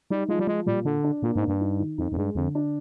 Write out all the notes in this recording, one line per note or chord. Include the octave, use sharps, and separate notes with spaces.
G3 D#4
F3 G#3
G3
F3 G#3
A#2 G3
D3 D4
D4
A#2 A#3
G#2
D4
G2
D#4
D#3
F2 D#4
F2
G2 G#3
F2 D3
D4